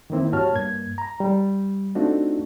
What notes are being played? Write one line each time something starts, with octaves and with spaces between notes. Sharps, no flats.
D#3 E3 A#3 C4 E4
G2 F#4 G4 C#5 A5 F6
G2 A#3 G#6
A#5
G3
A3 C4 D4 D#4 F4 F#4